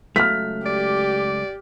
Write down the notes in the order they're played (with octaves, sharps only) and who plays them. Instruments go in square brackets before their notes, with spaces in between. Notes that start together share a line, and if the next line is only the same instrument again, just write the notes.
[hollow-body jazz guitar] C#2 F#3 A3 [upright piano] F6 B6
[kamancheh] G4 [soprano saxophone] D5